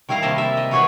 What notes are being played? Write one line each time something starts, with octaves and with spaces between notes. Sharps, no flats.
D#3 G3 E4 F5 A#5
C3 A#3 D#5 E5 A5
E5
D#5
E3 F#3 F#4 G#4 B4 C#5